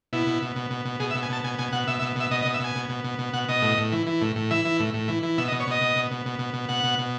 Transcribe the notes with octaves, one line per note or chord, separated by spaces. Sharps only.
B2 E4
B2
B2
B2
B2
B2
B2 G#4
E5
B2
G#5
B2 A5
B2 G#5
B2 G#5
B2 F#5
B2 E5
E5
B2
B2 E5
B2 D#5
D#5
B2
E5
B2 G#5
B2
B2
B2
B2
B2 F#5
B2 D#5
A2
A2
E3
E3
A2
A2
E3 E5
E3
A2
A2
E3
E3
B2 E5
D#5
B2
C#5
B2 D#5
B2
B2
B2
B2
B2
B2
B2 F#5
B2
B2